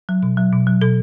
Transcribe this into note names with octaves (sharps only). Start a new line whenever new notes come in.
F#3
B2
F#3
B2
F#3
B2 A4